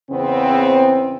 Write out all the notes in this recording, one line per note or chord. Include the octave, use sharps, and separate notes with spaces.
E2 C#3 B3 C4